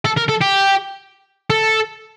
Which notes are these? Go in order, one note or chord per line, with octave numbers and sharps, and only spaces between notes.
A4
A#4
A4
G4
A4